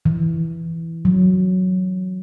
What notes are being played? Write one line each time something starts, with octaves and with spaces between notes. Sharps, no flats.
E3
F#3